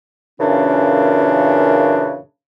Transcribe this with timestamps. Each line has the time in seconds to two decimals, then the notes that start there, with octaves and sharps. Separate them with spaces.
0.40 F#2 A#2 C#3 E3 C#4 D4